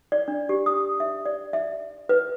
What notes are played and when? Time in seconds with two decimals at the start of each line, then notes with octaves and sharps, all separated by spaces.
0.12 D5
0.28 D4
0.49 G4
0.66 D#6
1.00 E5
1.25 D5
1.53 E5
2.09 B4